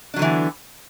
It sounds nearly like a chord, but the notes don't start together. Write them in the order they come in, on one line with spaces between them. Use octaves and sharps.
D4 F#3 D3 E3 B3